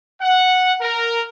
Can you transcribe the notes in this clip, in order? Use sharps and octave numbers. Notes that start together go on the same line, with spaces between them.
F#5
A#4